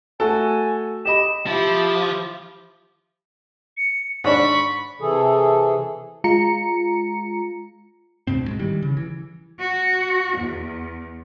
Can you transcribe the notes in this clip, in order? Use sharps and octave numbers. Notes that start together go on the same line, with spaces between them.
A3 F#4 A4 G#5
G4 D#5 B5 E7
F3 E4 G4
C#7
G#2 D4 B5 C#6
C3 E3 G#4 A4
G#3 F4 A#5 C#7
D2 G#2 B2 C4
G#2 G#3
D#3 E3 G3
C#3
E3
F#4
E2